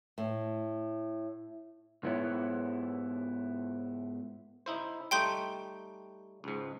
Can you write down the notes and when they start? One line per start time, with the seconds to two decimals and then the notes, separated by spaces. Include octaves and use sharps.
0.18 A2
2.03 G#2 B3 E4 C#5
4.66 D#4 E4 C5
5.11 G3 A3 D#4 G5 C6 G6
6.44 C#2 G#2